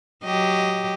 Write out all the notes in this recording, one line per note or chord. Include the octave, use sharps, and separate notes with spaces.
F#3 G4 D#5